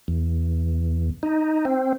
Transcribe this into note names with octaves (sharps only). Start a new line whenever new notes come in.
E2
D#4
C4